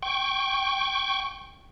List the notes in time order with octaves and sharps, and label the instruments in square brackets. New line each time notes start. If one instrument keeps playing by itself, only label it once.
[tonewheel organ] G5 C#6